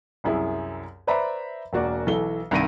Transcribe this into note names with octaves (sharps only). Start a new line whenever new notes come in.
C2 F#2 E4 G#4
B4 C5 D5 E5 A#5 B5
E1 A#3 F#4 D5
B1 E3 A4 G7
C2 G2 D#3 A#6 D7 D#7